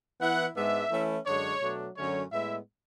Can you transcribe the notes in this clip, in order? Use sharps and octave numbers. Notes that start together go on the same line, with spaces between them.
E3 B3 E4 F#5
G#2 G#3 B3 D4 E5
E3 A3 C#4 E4
F#2 D3 G#3 D4 C#5
B2 F#3 A3 D4
F#2 D3 F#3 A3 C#4 C#5
A2 G#3 B3 E4 E5